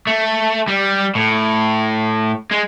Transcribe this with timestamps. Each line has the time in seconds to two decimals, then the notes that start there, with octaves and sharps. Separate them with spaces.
0.07 A3
0.68 G3
1.15 A2
2.51 G#3